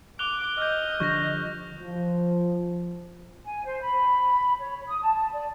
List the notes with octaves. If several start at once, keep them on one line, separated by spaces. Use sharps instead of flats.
D6 F#6 F7 G7
D#5 F6 G6
D3 F3 G3 C#6 G6 A#6
F3
G#5
C5
B5
C#5
D#6
A5
A5
D5